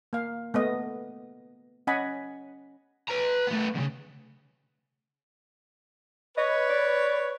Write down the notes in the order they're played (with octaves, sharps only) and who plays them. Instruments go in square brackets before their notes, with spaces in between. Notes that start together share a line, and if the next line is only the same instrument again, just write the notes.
[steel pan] A#3 F5
A3 B3 D#5
C#4 D#5 F#5 G#5 B5
[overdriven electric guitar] B4 A#5
A3 B3
E2 C#3
[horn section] B4 C#5 [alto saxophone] D#5
[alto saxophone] D5